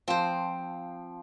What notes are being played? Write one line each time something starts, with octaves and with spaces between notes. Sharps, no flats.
F3 C4 C5